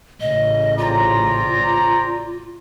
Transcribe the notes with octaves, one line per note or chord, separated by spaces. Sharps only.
A1 C#3 D#5
C4 F4 D5 A#5